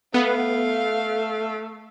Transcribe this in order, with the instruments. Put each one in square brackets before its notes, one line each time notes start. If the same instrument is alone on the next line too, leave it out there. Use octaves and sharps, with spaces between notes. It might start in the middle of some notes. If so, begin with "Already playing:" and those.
[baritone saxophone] A3 [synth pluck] B3 [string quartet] F5